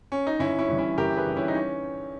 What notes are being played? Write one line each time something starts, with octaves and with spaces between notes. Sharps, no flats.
C#4
D#4
G1 C#4 E4
C#4 E4
G2 E3
C#4 E4
G1 G4 A#4
G#4 B4
G2 E3
C#4 E4
D#4
C#4